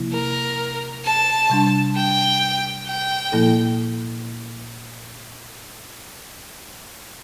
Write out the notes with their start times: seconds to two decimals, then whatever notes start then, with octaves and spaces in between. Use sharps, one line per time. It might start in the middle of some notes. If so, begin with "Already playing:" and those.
Already playing: C3 F3 A#3 E4
0.12 A#4
1.05 A5
1.50 C3 G3 D4
1.96 G5
2.86 G5
3.32 A#2 F3 A#3 E4 A4